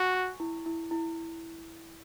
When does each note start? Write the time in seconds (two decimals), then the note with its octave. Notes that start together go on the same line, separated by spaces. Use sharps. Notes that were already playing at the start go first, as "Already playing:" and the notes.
Already playing: F#4 G#5
0.14 C#6
0.40 E4
0.66 E4
0.91 E4